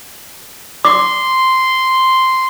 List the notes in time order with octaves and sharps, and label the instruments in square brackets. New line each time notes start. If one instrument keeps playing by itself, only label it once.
[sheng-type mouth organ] C6 [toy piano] D6